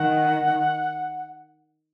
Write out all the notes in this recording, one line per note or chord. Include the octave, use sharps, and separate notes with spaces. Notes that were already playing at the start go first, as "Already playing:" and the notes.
Already playing: D#3 F#5